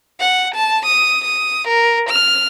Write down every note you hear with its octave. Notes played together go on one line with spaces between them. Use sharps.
F#5
A5
D#6
D#6
A#4
F6